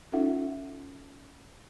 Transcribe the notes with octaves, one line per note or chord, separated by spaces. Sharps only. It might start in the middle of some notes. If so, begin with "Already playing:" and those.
C#4 D#4 F4 A4 E5 F#5